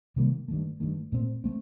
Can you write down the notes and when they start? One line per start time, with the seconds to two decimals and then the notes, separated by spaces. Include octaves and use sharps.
0.16 C3 D#3 G3 A#3
0.48 G2 D#3 A3
0.80 G2 D#3 A3
1.12 A#2 A3 C4
1.44 A3 C4